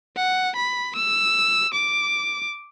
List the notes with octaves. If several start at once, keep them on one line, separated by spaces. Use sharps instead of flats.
F#5
B5
E6
D6